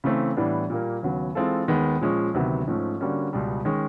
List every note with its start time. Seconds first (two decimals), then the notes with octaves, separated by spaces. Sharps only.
0.04 C#3 E3 A3 C4
0.37 A2 E3 G3 B3 D4
0.70 A#2 G3 A#3
1.03 D#2 C#3 F#3 B3
1.35 E3 G#3 C4 F4 A4
1.68 D#2 D#3 G#3 B3
2.01 A#2 F3 G#3 C#4
2.34 D2 C3 D#3 F#3 B3
2.67 G#2 F3 A3 C#4
3.00 D3 G3 A#3 C#4 F#4
3.33 C#2 B2 G3
3.65 D#3 G#3 C#4